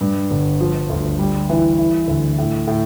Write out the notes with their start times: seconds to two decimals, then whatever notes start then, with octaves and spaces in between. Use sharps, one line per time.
0.01 G2
0.31 G1
0.61 F3
0.90 D2
1.19 G3
1.50 E3
1.78 E4
2.08 D2
2.38 A2
2.67 A2